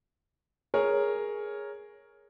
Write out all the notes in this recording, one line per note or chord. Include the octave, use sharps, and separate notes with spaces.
G#4 A#4 C#5